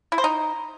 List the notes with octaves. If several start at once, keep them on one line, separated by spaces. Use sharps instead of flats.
E4
C5
D#4